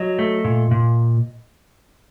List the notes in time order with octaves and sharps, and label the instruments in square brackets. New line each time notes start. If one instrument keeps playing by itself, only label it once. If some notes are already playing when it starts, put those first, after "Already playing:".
Already playing: [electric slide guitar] F#3 D#5
A3
A#2
A#2